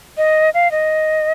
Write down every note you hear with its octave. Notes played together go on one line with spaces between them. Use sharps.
D#5
F5
D#5